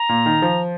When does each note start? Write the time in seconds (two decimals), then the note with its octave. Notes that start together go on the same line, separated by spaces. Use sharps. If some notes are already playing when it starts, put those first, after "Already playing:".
Already playing: A#5
0.09 A#2
0.26 D#3
0.42 F3